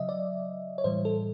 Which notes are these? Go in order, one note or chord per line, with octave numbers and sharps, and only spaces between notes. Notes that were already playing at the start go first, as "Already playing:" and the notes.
Already playing: C#3 F#3 D#5 E5
D5
C#5
A2 E3 G3 C5
A4